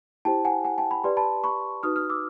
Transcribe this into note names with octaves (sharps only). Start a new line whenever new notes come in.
E4 G4 C5 G5 A5
F#5 G#5
F#5 G#5
G5 A5
B5
G4 B4 D5 C6
A5 B5
B5 C#6
D#4 F#4 B4 D#6 F6
D#6 F6
D6 E6